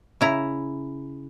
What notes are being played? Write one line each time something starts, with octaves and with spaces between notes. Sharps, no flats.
C#3 E4 A#5